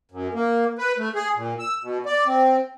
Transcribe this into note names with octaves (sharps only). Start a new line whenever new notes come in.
F#2
A#3
B4
A3
G#4
A#2
E6
B2
D5
C4